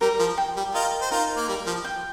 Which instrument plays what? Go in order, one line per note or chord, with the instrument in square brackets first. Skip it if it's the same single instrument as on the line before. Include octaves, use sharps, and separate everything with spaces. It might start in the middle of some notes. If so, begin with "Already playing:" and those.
[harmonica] G3 [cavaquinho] A#4
[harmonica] F3
[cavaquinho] G5
[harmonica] G3
[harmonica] F4 A#4 [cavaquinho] D#5
[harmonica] C5
[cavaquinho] D#4 [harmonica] F4 A#4
[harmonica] A#3
[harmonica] G3 [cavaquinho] A#4
[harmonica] F3
[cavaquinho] G5